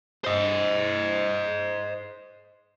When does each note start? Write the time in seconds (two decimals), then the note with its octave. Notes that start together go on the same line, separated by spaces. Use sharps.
0.25 C5 D#5